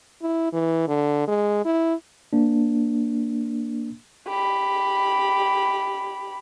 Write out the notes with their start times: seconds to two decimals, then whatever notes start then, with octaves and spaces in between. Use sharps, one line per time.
0.22 E4
0.53 E3
0.88 D3
1.28 G#3
1.65 E4
2.33 A#3 D4
4.28 G4 B5